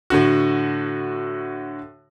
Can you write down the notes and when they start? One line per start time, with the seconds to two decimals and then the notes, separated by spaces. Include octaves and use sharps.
0.10 A2 D3 F#4